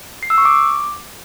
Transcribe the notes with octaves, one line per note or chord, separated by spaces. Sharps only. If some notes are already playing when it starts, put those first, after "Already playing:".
C7
E6
C#6
D6